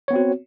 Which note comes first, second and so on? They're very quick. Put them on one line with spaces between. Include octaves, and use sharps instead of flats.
C#5 B3 C4 F#4